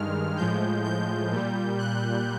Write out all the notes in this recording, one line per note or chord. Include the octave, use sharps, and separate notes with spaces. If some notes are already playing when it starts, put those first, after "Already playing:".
Already playing: G2 D#3 G#3 F6
A2 F3 G#3 G6
G6
A#2 G3
F#6